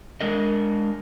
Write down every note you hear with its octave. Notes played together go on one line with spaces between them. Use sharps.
G#3 D4 A#4 D#5